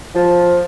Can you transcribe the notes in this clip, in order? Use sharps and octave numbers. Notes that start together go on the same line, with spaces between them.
F3